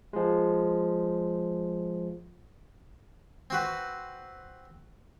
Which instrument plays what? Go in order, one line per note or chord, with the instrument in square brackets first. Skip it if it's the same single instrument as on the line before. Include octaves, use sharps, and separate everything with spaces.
[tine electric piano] F3 G#3
[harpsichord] C4 F#4 B4